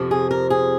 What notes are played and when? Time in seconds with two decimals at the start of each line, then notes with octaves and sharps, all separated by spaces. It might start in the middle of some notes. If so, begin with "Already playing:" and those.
Already playing: F2 C3 F3
0.11 G#4
0.31 A#4
0.50 G#4